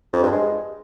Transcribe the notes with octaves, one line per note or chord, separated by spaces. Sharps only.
F2
G2
G#3